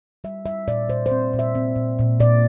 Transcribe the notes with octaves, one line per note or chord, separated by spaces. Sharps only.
G3 E5
G3 E5
A#2 D5
A#2 C5
C5
C4
A#2
E5
C4
A#2
A#2
A#2 D5